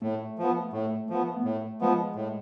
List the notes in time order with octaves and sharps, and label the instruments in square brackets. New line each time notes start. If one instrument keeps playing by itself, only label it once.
[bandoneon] A2 [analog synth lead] A3
[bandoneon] F3 B3
[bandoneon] A2 [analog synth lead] A3
[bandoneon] F3 B3 [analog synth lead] A3
[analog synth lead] B3
[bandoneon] A2 [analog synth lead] A3
[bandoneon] F3 B3 [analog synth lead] G#3
[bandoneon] A2